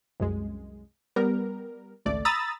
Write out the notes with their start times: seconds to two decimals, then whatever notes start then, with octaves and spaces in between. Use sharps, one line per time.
0.20 C2 F#2 G#3
1.16 G3 B3 A#4
2.05 G#1 C#2 A3 D5
2.25 A#5 B5 D#6 E6 A6